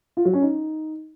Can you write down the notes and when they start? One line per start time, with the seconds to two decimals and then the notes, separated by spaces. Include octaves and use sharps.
0.17 F4
0.25 F#3
0.34 C#4
0.42 D#4